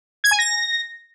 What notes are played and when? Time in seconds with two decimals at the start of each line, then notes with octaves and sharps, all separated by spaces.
0.24 G#6
0.31 G#5
0.39 A#6